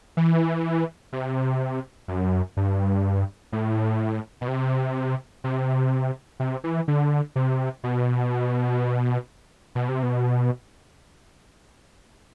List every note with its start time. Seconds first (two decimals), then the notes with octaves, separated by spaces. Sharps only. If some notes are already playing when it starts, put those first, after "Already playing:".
0.17 E3
1.13 C3
2.08 F#2
2.57 G2
3.52 A2
4.41 B2
4.48 C3
5.44 C3
6.40 C3
6.64 E3
6.88 D3
7.36 C3
7.84 B2
9.75 B2
9.89 C3
10.03 B2